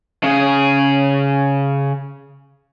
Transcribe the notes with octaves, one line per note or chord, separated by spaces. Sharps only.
C#3 G#4